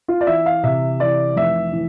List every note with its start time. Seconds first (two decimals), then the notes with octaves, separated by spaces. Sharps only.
0.08 F4
0.21 D5
0.27 E3 E5
0.46 F5
0.63 C3 E5
1.00 E3 D5
1.36 F1 E5
1.73 E3